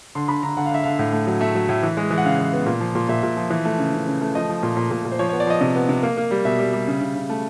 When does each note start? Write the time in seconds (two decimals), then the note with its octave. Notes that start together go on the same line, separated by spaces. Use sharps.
0.15 D3 C6
0.28 D3 B5
0.43 D3 A#5
0.57 D3 F#5
0.66 F5
0.71 D3 E5
0.84 D3 F5
0.99 A2
1.13 A3
1.27 F#3
1.41 A3 E5
1.55 F#3
1.69 A2
1.83 E3
1.97 G#3
2.11 E3
2.18 F#5
2.25 C#3 F5
2.39 E3
2.53 B3
2.66 A#2
2.80 F3
2.95 A#2
3.09 A#2 E5
3.23 A#2
3.37 F3
3.50 E3
3.65 A3
3.79 C#3
3.93 C#3
4.07 C#3
4.21 A3
4.35 F3 D#5
4.49 F3
4.63 A#2
4.77 A#2
4.91 A#2
5.05 A#2
5.12 C5
5.19 F3 C#5
5.29 B3 C#5
5.40 D5
5.47 F3 D#5
5.61 C3 D#5
5.75 B3
5.89 C3
6.03 A#3
6.17 A#3
6.31 G3
6.45 B2 E5
6.59 G3
6.73 G3
6.87 C#3
7.01 C#3
7.15 C#3
7.30 A3